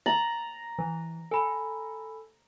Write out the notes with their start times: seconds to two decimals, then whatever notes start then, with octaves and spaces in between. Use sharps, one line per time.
0.06 A#5 A6 F#7
0.79 E3
1.31 A4 G#5 B5